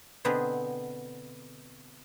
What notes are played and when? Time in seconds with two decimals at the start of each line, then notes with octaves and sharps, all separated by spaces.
0.25 B2 D3 B3 C4 G#4 B4